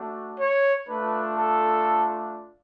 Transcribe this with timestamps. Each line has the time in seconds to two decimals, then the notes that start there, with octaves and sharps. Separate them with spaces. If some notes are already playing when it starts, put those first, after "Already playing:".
Already playing: A3 D4 F#4
0.39 C#5
0.88 A3 D4 F4 B4
1.37 A4